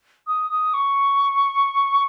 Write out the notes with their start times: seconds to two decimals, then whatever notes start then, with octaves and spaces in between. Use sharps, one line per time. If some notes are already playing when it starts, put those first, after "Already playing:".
0.27 D#6
0.50 D#6
0.74 C#6